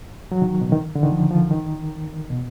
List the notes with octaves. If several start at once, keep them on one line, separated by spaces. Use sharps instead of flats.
F#3
D#3
B2
D#3
D3
D#3
F3
F3
D#3
B2